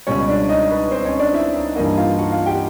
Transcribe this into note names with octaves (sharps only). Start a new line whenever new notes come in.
C#2 B2 G3 C#4 C#5
D4 D5
D#4 D#5
B4
C4 C5
C#4 C#5
D4 D5
E4 E5
D#4 D#5
G2 E3 G3 A#3 D#4 D#5
F4 F5
F#4 F#5
F4 F5
G4 G5